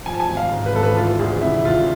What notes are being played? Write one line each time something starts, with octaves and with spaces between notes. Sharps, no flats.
F3 G#5
A5
G#5
G#1
F5
G#2
B4
G#1 A4
B4
E3 F4
D2 G#4
C3 E4
E4
D2 F4